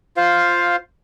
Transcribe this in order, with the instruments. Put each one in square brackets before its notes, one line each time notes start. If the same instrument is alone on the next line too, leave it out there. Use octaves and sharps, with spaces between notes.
[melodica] F4 C5 F5